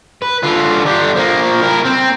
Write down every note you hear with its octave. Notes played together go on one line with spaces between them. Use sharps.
B4
D3 F4
D3 G4
F3 A#3
E4 A#4
C4